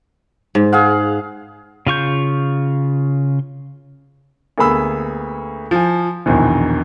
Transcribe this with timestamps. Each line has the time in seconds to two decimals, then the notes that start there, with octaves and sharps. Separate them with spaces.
0.55 G#2
0.72 G#4 F5 F#5
1.87 C#3 F4 C#6 G6
4.58 D2 A#3 B3 G#4 B5 E6
5.71 F3 G#5
6.26 A#1 E2 B2 D#3